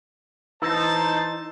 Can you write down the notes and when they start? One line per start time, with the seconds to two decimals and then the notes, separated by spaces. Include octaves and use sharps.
0.62 E3 D#4 C5 A5 E6